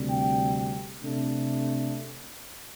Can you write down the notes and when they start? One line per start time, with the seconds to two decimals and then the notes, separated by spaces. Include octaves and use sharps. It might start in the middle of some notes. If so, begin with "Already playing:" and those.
Already playing: D2 C3 G3
0.10 G5
1.02 C3 A3 D4